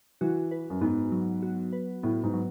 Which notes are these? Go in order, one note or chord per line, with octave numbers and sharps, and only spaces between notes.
E3 F#4
B4
F#2
G#2 B3
F#3
F#4
B4
A2 B3
G#2
F#3